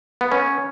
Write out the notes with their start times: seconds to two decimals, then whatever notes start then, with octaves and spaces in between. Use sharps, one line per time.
0.21 B3
0.32 C#4